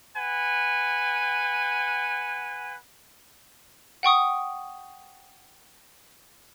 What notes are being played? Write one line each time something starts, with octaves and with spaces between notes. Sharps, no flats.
B4 F#5 G#5
F#5 G5 C#6 D#6